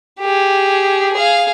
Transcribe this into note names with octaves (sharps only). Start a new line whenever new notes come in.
G4 G#4
G#4 F5